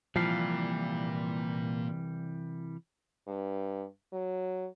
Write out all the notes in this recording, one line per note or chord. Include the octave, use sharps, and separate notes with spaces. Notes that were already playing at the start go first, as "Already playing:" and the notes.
C2 A#2 E3 F3 G3 F5
G2
F#3